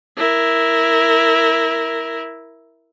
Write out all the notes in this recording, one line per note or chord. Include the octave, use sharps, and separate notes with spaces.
E4 A#4